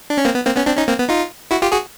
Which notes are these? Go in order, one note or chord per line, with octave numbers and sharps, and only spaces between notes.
D4
C#4
A#3 C4
B3
A#3 C4
B3 C#4
C4 D4
C#4 D#4
A#3 C4
B3
D#4 F4
E4 F#4
F4 G4
F#4 G#4